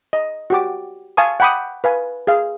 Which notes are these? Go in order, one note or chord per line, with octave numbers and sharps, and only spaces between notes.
D#5
F#4 G4 D6
F5 G#5 A5 C#6 D#6
F#5 G5 B5 D6 D#6
B4 F5 G#5
G#4 F5